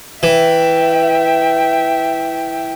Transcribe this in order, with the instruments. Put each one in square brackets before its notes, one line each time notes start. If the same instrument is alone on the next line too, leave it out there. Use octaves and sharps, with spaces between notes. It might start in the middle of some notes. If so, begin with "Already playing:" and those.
[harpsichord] E3 [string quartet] E5 G5